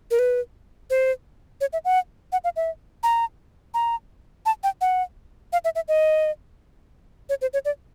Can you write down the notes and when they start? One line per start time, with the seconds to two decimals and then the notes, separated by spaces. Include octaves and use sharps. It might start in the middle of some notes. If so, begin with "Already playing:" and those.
0.11 A#4
0.19 B4
0.90 C5
1.61 C#5
1.73 E5
1.85 F#5
2.32 F#5
2.44 F5
2.56 E5
3.03 A#5
3.74 A#5
4.46 A5
4.63 G5
4.81 F#5
5.53 F5
5.65 E5
5.75 E5
5.88 D#5
7.29 C#5
7.41 C5
7.53 C#5
7.65 D5